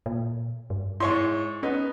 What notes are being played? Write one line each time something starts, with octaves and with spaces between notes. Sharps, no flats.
A#2
G2
G#2 E4 C#5 C6
B3 C#4 D#4